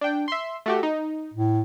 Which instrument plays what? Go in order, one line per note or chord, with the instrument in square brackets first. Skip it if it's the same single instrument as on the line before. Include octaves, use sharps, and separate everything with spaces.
[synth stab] D4 G5
E5 C6
A3 F#4 G4
D#4
[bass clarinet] A2